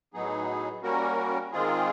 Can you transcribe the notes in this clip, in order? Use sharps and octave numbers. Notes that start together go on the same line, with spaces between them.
A2 F#3 B3 D#4 G#4
G3 A#3 C#4 F#4 A#4
D#3 G#3 C4 F4 G#4